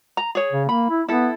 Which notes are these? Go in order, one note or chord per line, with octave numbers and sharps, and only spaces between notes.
A#5
G#4 C#5
C#3
A#3 B5
E4
B3 E4 A4